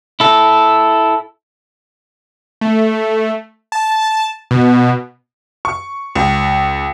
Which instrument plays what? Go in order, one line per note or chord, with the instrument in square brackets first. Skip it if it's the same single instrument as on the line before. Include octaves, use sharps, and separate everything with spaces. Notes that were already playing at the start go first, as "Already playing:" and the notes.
[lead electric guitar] E4 A4
[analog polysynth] A3
A5
B2
[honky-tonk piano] C#6
C#2